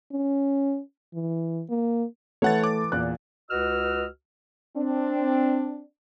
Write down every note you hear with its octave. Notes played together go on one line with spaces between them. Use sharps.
C#4
E3
A#3
E3 A3 B4 C#5 F#5 A6
D6
E2 A#2 F#6
C#2 F#4 B4 D#5 E6 F6
C4 D4